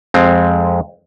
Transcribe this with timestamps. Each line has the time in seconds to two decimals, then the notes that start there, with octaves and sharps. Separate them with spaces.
0.14 F2 G#3 C4